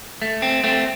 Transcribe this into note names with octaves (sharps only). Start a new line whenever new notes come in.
A3
C4
A3 C4